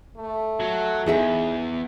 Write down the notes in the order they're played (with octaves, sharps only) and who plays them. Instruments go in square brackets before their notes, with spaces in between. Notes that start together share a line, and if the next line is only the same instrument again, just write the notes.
[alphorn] A3
[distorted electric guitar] F#3
[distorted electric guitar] E2 [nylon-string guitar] D#4 G#4 E5